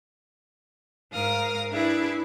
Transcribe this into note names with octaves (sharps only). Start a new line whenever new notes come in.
G#2 A#4 F5 D#6 F6
D4 E4 G#4 B4 E5